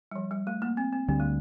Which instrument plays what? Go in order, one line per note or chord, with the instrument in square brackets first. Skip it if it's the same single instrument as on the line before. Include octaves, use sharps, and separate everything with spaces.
[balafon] G3
F3
G3
A3
A#3
C4
C4
[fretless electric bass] D2 D3 G3 [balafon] C4
[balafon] A3